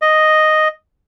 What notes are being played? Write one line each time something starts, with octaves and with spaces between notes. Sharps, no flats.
D#5